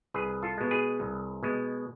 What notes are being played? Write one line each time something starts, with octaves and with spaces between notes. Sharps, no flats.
C2 G#4 B4
F4 A4
B2 G#3
G#4 B4
C2
B2 G#3